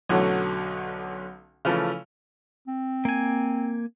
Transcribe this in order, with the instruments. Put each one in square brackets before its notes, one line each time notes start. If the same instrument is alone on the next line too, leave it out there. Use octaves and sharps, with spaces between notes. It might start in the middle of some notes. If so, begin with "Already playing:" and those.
[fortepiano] B1 D3 F#3 A3 C#4 F#4
C#3 E3 F3 A3
[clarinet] C4
[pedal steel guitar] A#3 G#5